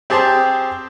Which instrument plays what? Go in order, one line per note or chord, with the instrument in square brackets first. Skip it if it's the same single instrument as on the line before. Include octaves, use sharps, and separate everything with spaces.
[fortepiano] C4 G4 G#4 A5 C6